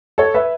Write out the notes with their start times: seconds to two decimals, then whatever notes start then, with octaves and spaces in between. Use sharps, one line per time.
0.18 A4 C#5
0.34 B4 E5